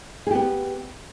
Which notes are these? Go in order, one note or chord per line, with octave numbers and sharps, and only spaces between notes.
B3 G4 G#4